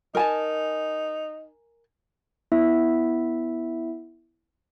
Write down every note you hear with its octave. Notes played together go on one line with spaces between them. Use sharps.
D#4 A#4 G#5 A5
B3 E4 E5